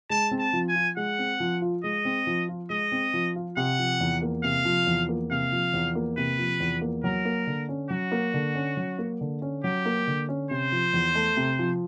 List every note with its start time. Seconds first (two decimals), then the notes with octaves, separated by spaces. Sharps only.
0.10 G#3 A5
0.31 C4
0.39 A5
0.53 F3
0.69 G#5
0.75 F4
0.97 G#3 F#5
1.19 C4
1.40 F3
1.61 F4
1.84 G#3 D#5
2.05 C4
2.27 F3
2.49 F4
2.70 G#3 D#5
2.92 C4
3.14 F3
3.36 F4
3.57 C3 F#5
3.79 F3
4.01 E2
4.22 A#3
4.43 C3 F5
4.65 F3
4.87 E2
5.09 A#3
5.31 C3 F5
5.52 F3
5.74 E2
5.95 A#3
6.17 C3 B4
6.39 F3
6.60 E2
6.82 A#3
7.04 F#3 A#4
7.25 A#3
7.47 D3
7.69 C#4
7.90 F#3 F#4
8.12 A#3
8.34 D3
8.55 C#4
8.77 F#3
8.99 A#3
9.21 D3
9.42 C#4
9.64 F#3 G4
9.85 A#3
10.07 D3
10.29 C#4
10.50 C3 C5
10.72 F3
10.93 E2
11.15 A3
11.37 C3
11.59 F3